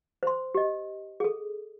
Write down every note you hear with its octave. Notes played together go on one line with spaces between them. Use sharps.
C5 C6
G4 D#5
G#4 A4